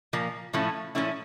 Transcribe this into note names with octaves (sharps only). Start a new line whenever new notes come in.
A#2 F3 A#3
A2 F3 A3 C#4 E4
A#2 F3 A3 C#4 E4